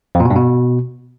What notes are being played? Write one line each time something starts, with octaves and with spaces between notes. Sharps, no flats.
F2
A#2
B2
G2
B2